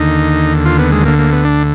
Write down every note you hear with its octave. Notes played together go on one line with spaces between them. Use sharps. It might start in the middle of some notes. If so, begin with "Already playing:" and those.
Already playing: D#2 D3 D#4
F4
B3
G#3
D2 D3 A#3
A#3
B3
D4